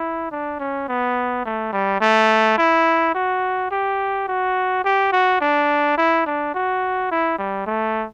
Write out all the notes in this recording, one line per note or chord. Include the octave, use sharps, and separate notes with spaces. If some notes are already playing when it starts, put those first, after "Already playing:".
Already playing: E4
D4
C#4
B3
A3
G3
A3
E4
F#4
G4
F#4
G4
F#4
D4
E4
D4
F#4
E4
G3
A3